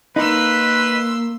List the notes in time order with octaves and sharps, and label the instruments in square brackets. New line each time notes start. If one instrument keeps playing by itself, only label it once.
[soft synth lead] A#3 [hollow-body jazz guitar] D#4 [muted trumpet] B4 [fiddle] C6 E6